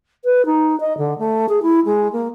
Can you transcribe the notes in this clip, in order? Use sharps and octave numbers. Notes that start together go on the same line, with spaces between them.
B4
D#4
D#5
D3
A3
G#4
E4
G#3
A#3